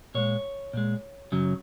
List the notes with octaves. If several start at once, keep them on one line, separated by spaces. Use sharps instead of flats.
A#2 G#3 C#5
A#2 G#3
F#2 C#3 F#3